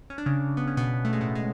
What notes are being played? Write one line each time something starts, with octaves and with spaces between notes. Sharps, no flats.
C#4
D4
C#3 C#4
B3
C#4
B2 B3
A3
G#3
A2 A3
G#3